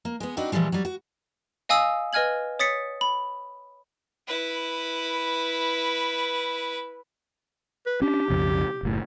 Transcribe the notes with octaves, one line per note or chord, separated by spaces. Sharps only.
A#3
G#3 B3
C4 D4 D#4 F#4 B4
A#2 E3 F3 G3 G#3
F#3 G3
F#4
D#5 F5 G#5 D#6 E6
B4 D#5 G#5 F6 G#6 F#7
C#5 D#6 A6 B6 C#7
B5
E4 B4
B4
C#4 D4 G4
B1 F2 C#3
F#1 A2